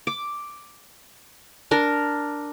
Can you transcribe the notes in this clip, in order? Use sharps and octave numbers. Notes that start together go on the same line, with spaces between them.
D6
D4 A#4